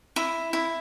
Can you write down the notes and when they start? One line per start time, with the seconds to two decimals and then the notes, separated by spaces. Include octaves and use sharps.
0.16 E4
0.53 E4